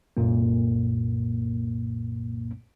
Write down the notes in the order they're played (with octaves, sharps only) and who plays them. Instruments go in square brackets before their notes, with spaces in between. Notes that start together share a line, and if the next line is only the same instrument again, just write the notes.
[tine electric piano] C2 F#2 A#2 A#3